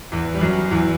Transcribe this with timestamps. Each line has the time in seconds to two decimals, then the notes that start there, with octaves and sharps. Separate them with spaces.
0.12 E2 E3
0.34 G3
0.41 F#2 F#3
0.71 E2 E3